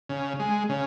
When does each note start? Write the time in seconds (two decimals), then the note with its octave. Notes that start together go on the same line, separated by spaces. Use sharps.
0.09 C#3
0.40 G#3
0.69 C#3